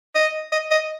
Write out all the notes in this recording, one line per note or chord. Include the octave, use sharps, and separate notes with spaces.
D#5
D#5
D#5